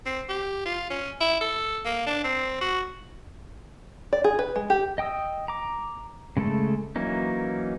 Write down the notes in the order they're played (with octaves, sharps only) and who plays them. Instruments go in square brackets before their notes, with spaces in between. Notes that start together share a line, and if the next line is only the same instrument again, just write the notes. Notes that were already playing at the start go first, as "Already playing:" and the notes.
[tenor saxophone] C4
G4
F4
C#4
E4
A4
A#3
D4
C4
F#4
[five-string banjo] D5
G#4
B4
G#3
G4
[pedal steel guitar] D#5 G5 D#6 E6
A#5 D6
C#3 G#3 A3 A4
E3 F#3 A#3 C#4 D#4